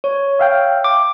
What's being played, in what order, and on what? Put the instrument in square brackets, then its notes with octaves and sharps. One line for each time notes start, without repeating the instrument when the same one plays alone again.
[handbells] C#5
[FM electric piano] E5 F5 G5
[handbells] D6